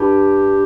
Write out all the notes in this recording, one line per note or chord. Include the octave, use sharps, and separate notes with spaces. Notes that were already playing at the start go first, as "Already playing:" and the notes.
Already playing: G2 G4